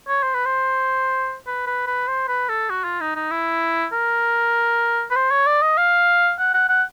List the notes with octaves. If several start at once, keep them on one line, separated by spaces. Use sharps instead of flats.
C#5
C5
B4
C5
B4
B4
B4
C5
B4
A4
F#4
F4
D#4
D#4
E4
A#4
B4
C5
C#5
D5
D#5
F5
F#5
F#5
F#5